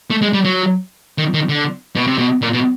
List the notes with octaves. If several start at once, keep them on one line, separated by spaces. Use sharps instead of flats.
A3
G#3
G3
F#3
D#3
D#3
D3
B2
C3
B2
A#2
B2